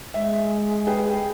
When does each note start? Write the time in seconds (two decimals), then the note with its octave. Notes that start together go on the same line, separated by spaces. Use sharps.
0.14 G#3 E5
0.87 G#4 B4 G5